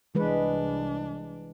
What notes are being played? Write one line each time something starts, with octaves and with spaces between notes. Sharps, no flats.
C2 E3 G#3 D4 B4